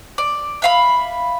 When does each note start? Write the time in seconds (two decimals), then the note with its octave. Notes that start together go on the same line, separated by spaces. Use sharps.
0.18 D5
0.62 E5 F5 B5